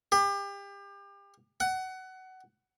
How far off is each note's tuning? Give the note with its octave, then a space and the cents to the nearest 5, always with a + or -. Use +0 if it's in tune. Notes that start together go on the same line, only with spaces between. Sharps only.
G4 +30
F#5 +20